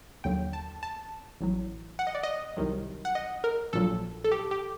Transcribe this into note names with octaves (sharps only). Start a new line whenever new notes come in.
D#2 D3 F#3 G5
A5
A5
A1 A2 F#3
F#5
D#5
D5
D#5
C2 C3 D#3 F#3
F#5
D#5
A#4
A#1 A#2 F#3 A4
A4
G4
G4